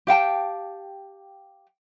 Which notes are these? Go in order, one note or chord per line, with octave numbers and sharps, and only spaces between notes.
G4 F5 G5 A5